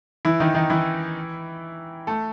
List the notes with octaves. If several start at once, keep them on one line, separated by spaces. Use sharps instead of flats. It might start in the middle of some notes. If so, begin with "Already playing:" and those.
E3 E4
D#3 D#4
D#3 D#4
E3 E4
A3 A4